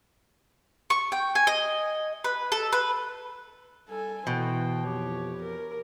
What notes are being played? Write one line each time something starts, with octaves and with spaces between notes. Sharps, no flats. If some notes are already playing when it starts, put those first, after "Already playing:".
C#6
G5
G#5
D#5
B4
A4
B4
G3 A4 G#5
B2 E3 C5 G5
F2 G4 C#5
A#4